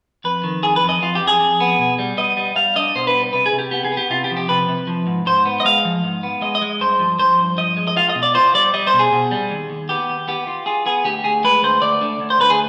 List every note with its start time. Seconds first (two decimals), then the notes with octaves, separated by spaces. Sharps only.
0.24 F2 B4
0.44 D#3
0.63 F2 G#4
0.76 B4
0.83 F2
0.89 D#5
1.02 F2 F4
1.15 G4
1.21 F2
1.27 G#4
1.40 F2
1.60 B3
1.79 B2
1.99 G3
2.17 B3 D#5
2.37 G3
2.56 G3 F5
2.76 D4 D#5
2.95 B2 C5
3.07 B4
3.14 G3
3.33 C3 B4
3.46 G#4
3.53 C3
3.59 G4
3.71 B3 G4
3.85 G#4
3.92 B3
3.97 G4
4.10 C3 F4
4.24 G4
4.31 F3
4.37 G4
4.49 C3 B4
4.69 C3
4.87 F3
5.07 G#2
5.26 G#2 C5
5.45 B3
5.60 D#5
5.65 G#3 F5
5.85 F3
6.04 G#2
6.23 B3
6.41 G#3 D#5
6.55 D#5
6.62 G#3
6.80 G2 C5
6.99 F3
7.19 F3 C5
7.39 G2
7.58 F3 D#5
7.77 G#3
7.87 D#5
7.96 F4 F5
8.09 D#5
8.15 B2
8.23 D5
8.34 F4 C5
8.54 G3 D5
8.74 G3 D#5
8.87 C5
8.93 B2
8.99 G#4
9.12 B2
9.31 G3
9.50 D#2
9.70 D#2
9.89 B3 G4
10.09 D#2
10.28 B3 G4
10.47 F4
10.66 F4 G#4
10.86 B3 G#4
11.05 D2 G4
11.24 D2 G#4
11.44 G#3 B4
11.63 D2 C5
11.82 D2 D5
12.01 D3
12.20 D2
12.30 C5
12.40 D2 B4
12.50 G#4